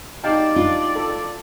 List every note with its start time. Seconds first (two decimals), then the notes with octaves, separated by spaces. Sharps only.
0.24 D#4 F#4 G4 D5 F5 G5 A5
0.56 D4 F4
0.96 A4